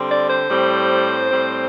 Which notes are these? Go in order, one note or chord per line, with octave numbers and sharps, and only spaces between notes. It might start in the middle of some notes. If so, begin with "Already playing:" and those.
Already playing: D3 G3 C4
D5
C5
A2 G3 C4
A2 G3 C4